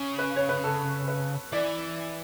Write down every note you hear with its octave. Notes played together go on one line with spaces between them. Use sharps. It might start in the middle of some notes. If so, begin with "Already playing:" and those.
Already playing: C#3
B4
C#5
B4
A4
B4
E3 D5